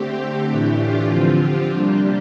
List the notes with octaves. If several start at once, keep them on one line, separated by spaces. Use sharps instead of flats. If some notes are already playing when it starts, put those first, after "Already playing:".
Already playing: D3 A3 C4 G4
A2 E3 A3 D4
F4
D3 F3 C4
G4
C3 G3 A#3 D4